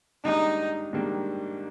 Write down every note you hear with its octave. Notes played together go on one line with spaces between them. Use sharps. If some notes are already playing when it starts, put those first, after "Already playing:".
G#2 D#3 G3 A#3 D4 D#4
G#2 D#3 G3 A#3 D4